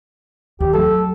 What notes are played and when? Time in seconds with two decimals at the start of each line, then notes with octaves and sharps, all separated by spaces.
0.60 D#2 G4
0.73 F#3 A3 A4